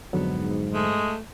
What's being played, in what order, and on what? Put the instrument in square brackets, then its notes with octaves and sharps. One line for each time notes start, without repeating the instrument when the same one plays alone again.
[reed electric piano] F2 D3 F#3 [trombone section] G#2 [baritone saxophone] B3
[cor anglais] G#3 [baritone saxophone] A3